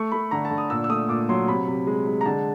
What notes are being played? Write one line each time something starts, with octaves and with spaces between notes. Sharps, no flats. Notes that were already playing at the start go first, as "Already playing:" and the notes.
Already playing: A3 C#6
A3 B5
D3 A#5
A5
D3
D#6
A#2 E6
E6
A3 D#6
A#2 D6
F#3 C6
C3 B5
C3
G#3
G#3
A#5
D3 A5